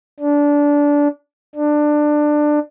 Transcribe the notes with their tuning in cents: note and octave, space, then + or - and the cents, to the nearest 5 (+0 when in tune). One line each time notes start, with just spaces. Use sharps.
D4 -15
D4 +20